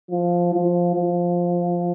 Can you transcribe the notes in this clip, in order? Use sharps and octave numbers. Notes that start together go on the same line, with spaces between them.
F3
F3
F3